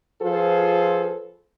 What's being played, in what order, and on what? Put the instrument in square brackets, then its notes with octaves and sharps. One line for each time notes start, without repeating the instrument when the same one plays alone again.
[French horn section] F3 F4 G#4 A4 B4 C5